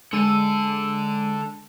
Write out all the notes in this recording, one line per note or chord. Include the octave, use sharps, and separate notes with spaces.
D3 G#3 A4 E6 D#7